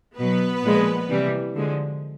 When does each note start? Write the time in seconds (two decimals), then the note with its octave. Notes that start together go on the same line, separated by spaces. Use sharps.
0.18 B2 F#3 B3 B4
0.64 A#2 F3 G#3
1.09 C3 E3 G3
1.55 D3 F3 G#3